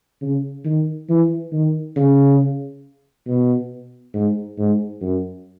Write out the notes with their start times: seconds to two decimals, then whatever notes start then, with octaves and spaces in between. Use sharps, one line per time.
0.21 C#3
0.65 D#3
1.09 E3
1.52 D#3
1.96 C#3
3.27 B2
4.14 G#2
4.58 G#2
5.01 F#2